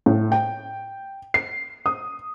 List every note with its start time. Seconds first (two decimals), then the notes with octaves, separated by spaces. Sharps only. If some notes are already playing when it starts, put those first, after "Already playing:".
0.06 A2
0.32 G5
1.34 C7
1.86 D#6